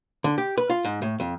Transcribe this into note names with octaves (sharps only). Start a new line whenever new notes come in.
D3
G4
B4
F4
G#2
A2
F2